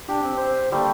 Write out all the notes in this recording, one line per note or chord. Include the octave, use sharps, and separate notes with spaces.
D4 G4
C4
C5
D3 G3 A3 A#3